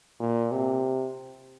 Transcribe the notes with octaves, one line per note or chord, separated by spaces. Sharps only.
A#2
C3